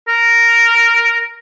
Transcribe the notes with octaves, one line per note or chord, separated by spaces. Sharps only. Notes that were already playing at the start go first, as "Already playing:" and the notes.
A#4